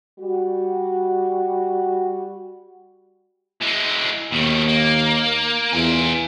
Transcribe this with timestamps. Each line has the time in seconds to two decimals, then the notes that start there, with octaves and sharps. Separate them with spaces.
0.19 G3 F#4
3.61 E3 G#3
4.31 D#2 B2 D#3
4.68 A#3
5.73 E2 F4 G#5